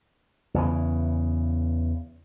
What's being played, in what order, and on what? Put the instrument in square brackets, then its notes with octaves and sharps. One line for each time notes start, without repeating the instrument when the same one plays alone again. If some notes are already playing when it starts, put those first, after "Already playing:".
[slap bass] E2 C#3 E3